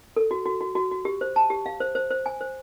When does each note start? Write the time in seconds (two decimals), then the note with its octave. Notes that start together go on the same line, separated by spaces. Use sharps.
0.16 A4
0.31 F#4
0.46 F#4
0.61 F#4
0.75 F#4
0.91 F#4
1.05 G4
1.21 C5
1.36 A5
1.50 G4
1.66 F5
1.80 C5
1.95 C5
2.11 C5
2.26 G#5
2.41 C5